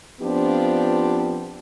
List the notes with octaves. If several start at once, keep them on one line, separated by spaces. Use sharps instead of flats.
F3 B3 C4 D4 F4 G4